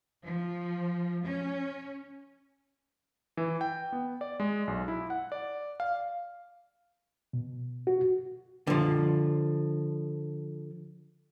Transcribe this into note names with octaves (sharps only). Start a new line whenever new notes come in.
F3
C#4
E3
G5
B3
D5
G#3
B1
E4
F#5
D5
F5
B2
F#4
D3 F3